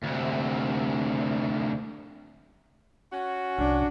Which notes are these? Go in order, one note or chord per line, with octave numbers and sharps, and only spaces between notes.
D2 C3
C#4 F#4
C2 D4